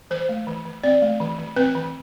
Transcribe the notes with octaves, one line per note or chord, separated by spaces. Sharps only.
E3 C5
A3
E3
E3
C4 D5
A3
E3
E3
C4 B4
E3